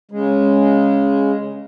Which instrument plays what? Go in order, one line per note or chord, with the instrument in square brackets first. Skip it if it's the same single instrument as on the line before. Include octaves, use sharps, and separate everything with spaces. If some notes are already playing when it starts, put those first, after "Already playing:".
[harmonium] C#3 G#3